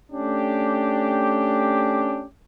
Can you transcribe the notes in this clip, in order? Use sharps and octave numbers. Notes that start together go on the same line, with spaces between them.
A3 C#4 D4 G4